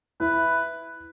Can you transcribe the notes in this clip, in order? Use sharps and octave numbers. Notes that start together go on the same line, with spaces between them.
E4 B4